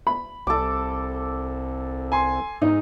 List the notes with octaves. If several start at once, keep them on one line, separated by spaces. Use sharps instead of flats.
B5
C2 A4 D6
G#5 C6
G#2 D#4 D#5